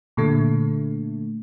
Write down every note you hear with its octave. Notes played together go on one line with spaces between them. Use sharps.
A#2 D3 A3